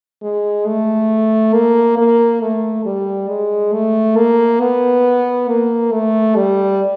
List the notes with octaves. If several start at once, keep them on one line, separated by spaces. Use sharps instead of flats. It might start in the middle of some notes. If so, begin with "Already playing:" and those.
G#3
A3
A#3
A#3
A3
G3
G#3
A3
A#3
B3
A#3
A3
G3